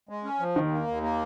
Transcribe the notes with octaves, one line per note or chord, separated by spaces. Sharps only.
G#3
C#4
F3
D#2 D#3
A#3
D#2
A#3